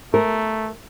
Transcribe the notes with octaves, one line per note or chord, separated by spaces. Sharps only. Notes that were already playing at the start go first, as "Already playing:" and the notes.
A3 A#4